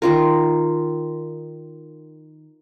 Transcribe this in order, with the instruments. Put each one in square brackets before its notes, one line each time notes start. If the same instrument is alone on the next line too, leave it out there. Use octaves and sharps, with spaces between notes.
[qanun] D#3 F4 A#4